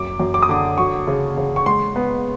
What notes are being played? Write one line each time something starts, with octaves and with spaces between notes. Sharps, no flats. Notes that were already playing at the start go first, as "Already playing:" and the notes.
Already playing: F#2 D6
F#2
D6
D#6
D3 D6
F#3 C#6
C#3
C#3
C#6
G#3 C6
B3